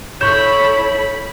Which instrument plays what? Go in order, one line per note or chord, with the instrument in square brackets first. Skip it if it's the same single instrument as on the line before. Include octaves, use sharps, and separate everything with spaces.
[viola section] E4 A4 B5 [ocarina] C#5 [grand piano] C#6 G6 E7